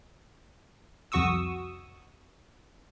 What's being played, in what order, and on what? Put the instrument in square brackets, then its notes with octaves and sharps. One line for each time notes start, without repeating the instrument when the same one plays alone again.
[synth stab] C2 F2 F#4 C#6 D#6 E6